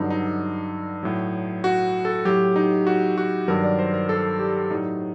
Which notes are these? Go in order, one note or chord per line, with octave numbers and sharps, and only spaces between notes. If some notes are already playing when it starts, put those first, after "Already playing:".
Already playing: G2 D3 F#3 D#4
D#4
A2 F#3
F#4
A4
A2 F#3 G4
D#4
F#4
F#4
G2 D#3 F#3 A#4
D5
C5
A#4
A4
G4
A2 F#3 D#4